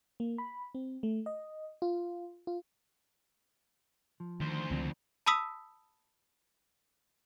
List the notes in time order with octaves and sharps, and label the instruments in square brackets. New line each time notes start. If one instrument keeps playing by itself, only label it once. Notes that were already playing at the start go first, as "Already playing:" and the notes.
[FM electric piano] A#3
B5
C4
A3
D#5
F4
F4
[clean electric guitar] F3
[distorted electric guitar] D2 C5 [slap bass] D#3
[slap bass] C#2 D#3 C4 [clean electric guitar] F3
[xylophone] A5 B5 D#6 E6 B6